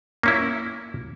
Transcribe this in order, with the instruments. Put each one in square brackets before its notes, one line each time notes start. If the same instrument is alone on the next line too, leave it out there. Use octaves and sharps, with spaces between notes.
[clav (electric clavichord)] A#3 C#4 E4